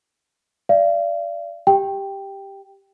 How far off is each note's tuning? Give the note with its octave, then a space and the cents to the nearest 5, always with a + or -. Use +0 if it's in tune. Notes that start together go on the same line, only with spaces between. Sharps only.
D5 -5 F5 -45
G4 +5 G5 +0